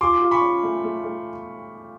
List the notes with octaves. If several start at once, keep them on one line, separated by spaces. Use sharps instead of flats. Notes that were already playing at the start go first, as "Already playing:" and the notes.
F4 C6 D6
F4
B5 C#6
C#4
A3
A3
A3